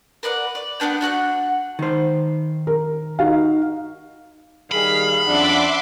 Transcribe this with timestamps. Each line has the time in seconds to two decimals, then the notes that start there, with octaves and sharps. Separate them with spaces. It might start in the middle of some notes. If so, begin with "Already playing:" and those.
0.23 A#4 B4 D5 F#5
0.55 D5
0.80 B3 C#4 D4 G5
1.01 D4 F#4 F#5 F#6
1.79 D#3 C5
2.67 A#4
3.19 D#4 F#4 F5
4.72 D#3 G3 G#4 F5 B5
5.27 F2 C#4 D4 E5 F#5 C6 D6